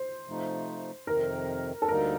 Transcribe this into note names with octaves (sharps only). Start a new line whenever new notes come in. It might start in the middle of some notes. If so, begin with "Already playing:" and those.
Already playing: C5
C3 F3 A3 D#4
F2 C3 D#3 A#4
A4
D2 D3 G3 A#3 D#4 A#4